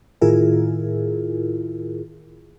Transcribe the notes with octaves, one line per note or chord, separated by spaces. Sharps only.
A2 D#3 E4 F4 G#4 A#4